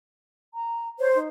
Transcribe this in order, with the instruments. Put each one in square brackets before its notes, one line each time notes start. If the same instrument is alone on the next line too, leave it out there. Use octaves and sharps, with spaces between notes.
[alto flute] A#5
[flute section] C5 [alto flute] C#5
[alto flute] D#4